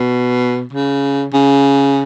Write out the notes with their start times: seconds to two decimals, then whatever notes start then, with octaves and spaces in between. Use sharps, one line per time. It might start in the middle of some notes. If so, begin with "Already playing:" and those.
Already playing: B2
0.73 C#3
1.33 C#3